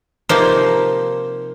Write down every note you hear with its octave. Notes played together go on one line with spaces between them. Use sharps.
C3 F3 A#3 D#4 C5